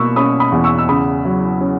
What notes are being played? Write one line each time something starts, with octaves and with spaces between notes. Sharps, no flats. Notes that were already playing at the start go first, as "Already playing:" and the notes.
Already playing: B2 A#3 B5 C#6 E6
C#4 B5 D#6
B5 D#6
E2
C#6 E6
E6
C#3 B5 D#6
F#3
C#4